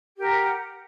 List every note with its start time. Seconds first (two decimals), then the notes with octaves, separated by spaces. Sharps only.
0.16 G4
0.19 A#4
0.22 F#5